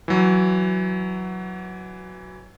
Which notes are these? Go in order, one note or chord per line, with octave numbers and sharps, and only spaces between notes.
E3 F#3